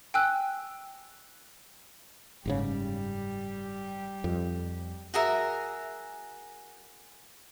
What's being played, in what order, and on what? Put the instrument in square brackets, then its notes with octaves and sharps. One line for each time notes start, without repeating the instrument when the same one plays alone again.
[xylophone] G5 G#5 E6 F#6
[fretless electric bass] F#1 G#2 C#3 [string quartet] G3 G4
[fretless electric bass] F2
[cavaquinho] F#4 G#4 A#4 E5